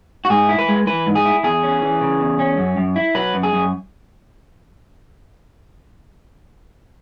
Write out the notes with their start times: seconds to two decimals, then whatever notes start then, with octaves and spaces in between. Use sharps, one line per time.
0.25 F#4
0.30 G#2 G#4
0.49 E4
0.59 B4
0.68 G#3
0.87 E3 B4
1.06 G#2
1.15 G#4
1.25 E4
1.44 E2 G#4
1.63 C#4
1.82 E3
2.01 C#3
2.20 E2
2.39 C#4
2.58 F#2
2.77 F#2
2.96 E4
3.15 F#3 B4
3.34 F#2
3.43 G#4
3.53 F#2